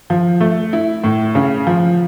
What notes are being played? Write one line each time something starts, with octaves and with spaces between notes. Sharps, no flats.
F3
A3
E4
A2
C#3
F3